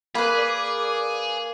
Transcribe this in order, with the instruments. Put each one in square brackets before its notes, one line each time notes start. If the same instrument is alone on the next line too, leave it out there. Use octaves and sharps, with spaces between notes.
[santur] A#3 [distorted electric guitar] G#4 [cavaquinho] B4 B5
[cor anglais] D5